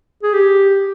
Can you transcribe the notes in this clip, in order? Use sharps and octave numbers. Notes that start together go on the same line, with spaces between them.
G#4
G4